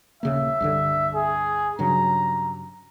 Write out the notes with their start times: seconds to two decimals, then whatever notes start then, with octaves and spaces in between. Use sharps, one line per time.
0.23 D#1 C#3 A#3 E5
0.60 C2 G2 D3
1.15 G#4
1.79 G2 C#3 F#3 A#5